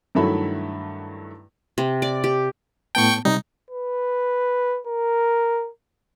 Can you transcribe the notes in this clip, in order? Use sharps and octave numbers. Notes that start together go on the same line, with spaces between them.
G2 D#3 F#3 A3 E4 B5
C3
D5
G4
A2 B3 G5 A5 C#6
C3 G3 D#4
B4
A#4